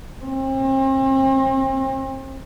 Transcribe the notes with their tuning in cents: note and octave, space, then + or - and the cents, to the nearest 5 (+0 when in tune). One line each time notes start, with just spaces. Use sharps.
C4 +40